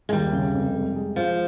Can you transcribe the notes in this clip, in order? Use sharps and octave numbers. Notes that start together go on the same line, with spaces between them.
G#3
D#2 G3
C#3
F1
G#3
G#3
F3 G#3